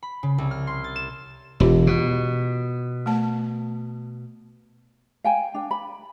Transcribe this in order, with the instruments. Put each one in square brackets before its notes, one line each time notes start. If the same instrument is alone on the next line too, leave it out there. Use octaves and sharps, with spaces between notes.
[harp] B5
C#3
C2
F6
C6
A6
E7
[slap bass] E1 [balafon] F4 G4
[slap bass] B2
[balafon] A3 A5
[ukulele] F5 G5 G#5
D4 G5
B5